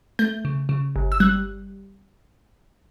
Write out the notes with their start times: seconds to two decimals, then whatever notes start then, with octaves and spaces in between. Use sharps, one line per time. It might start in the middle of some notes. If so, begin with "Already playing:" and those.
0.19 A3 G6
0.45 C#3
0.69 C#3
0.96 G1
1.12 E6
1.20 G3 F#6